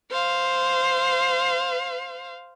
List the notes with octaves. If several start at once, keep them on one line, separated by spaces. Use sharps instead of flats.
C5 F5